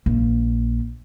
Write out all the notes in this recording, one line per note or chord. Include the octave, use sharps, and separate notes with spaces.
A#1